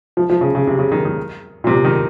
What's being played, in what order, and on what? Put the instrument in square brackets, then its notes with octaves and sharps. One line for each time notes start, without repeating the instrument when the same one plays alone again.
[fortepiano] F3
F3
C#3
C#3
C3
C#3
D#3
D#3
A#2
C3
D#3